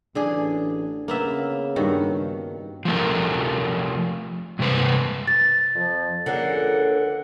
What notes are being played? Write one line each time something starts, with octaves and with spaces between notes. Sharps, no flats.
A1 D3 D4 G#4
C#3 A#3 B3 E5
G2 D#3 F#4
F3 A3 A#4
G2 C3 G#3 B4 C5
A6
F2 F3
C#2 D3 A#3 C#4 F#5